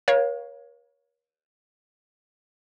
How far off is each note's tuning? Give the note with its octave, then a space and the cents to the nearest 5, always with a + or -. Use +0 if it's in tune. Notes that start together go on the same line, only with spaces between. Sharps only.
A#4 +40 C#5 +0 F5 +0